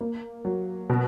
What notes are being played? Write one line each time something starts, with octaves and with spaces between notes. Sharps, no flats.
A#3
F#3
B2